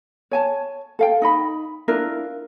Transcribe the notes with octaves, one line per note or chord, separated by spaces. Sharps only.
C#5 G#5 A5
A4 F5 G5
D#4 D#5 B5
D4 E4 F4 A#4